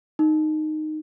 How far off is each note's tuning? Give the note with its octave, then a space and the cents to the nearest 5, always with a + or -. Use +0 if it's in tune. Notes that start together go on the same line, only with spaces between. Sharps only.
D#4 -10